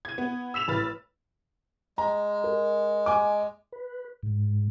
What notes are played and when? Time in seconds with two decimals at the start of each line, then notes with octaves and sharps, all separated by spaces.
0.05 G#6 D#7
0.18 B3
0.54 E6 B6 E7 F7
0.68 A1 A2 B4 F6 A6
1.98 G#3 A#5
2.44 A#4
3.06 G#5 D6
3.72 B4
4.23 G#2